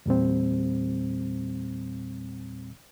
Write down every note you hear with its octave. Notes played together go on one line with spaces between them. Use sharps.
E2 A#2 G3 C4